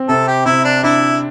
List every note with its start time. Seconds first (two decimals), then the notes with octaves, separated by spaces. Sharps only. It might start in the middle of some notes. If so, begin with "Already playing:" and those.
Already playing: C4
0.09 C3 A4
0.28 G4
0.46 C3 E4
0.65 D4
0.83 D4 E4